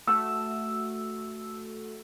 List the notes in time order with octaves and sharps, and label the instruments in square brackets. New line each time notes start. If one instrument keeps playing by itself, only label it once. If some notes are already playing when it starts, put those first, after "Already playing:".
[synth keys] A3 F#4 [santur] E6